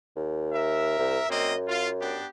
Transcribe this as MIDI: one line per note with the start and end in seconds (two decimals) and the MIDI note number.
0.16 0.94 39
0.53 1.25 70
0.53 1.25 76
0.99 1.20 36
1.29 2.20 42
1.29 1.53 58
1.29 1.53 60
1.29 1.53 75
1.68 1.88 65
2.00 2.26 59
2.00 2.26 62
2.00 2.26 67